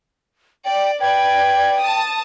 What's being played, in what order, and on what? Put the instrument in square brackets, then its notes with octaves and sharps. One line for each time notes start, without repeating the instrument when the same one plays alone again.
[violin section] D5 [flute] G5
[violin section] B4 D5 G#6 [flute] G5
[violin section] A5 D#6